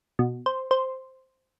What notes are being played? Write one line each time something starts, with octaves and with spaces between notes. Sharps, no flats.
B2
C5
C5